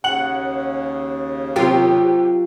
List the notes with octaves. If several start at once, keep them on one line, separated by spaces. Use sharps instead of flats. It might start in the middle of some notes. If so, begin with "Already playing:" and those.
D#2 C#3 F#5 F#7
C3 F#3 F4 G4 A#4